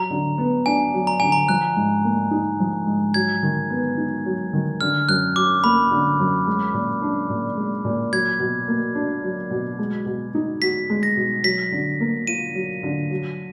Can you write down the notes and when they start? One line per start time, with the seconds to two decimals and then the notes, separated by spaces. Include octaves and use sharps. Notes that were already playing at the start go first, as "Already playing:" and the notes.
Already playing: F#3 A#5
0.11 D3
0.38 B3
0.66 D4 G#5
0.94 F#3
1.07 A#5
1.20 D3 G#5
1.32 A#5
1.49 F3 F#6
1.76 G#2
2.05 A#3
2.31 D#4
2.60 F3
2.87 G#2
3.14 F#3 G#6
3.43 D#3
3.70 B3
3.98 D#4
4.26 F#3
4.53 D#3
4.81 D3 F6
5.09 F#2 F#6
5.36 F#3 D6
5.64 A#3 B5
5.91 D3
6.19 F#2
6.47 G#3
6.74 A#2
7.02 D4
7.30 A#2
7.57 G#3
7.85 A#2
8.13 F#3 G#6
8.40 B2
8.68 A#3
8.95 D4
9.23 F#3
9.51 B2
9.79 G#3
10.06 B2
10.35 D#4
10.62 F#4 B6
10.90 G#3
11.03 A#6
11.17 B2
11.44 F#3 B6
11.72 D3
12.00 A#3
12.27 F4 D#7
12.55 F#3
12.83 D3
13.11 F#3